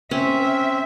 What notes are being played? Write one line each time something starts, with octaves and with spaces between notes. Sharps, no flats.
C4 C#4 E5